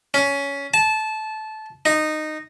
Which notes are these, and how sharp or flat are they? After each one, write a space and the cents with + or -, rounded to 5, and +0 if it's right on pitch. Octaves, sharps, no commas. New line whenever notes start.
C#4 +15
A5 -20
D#4 -15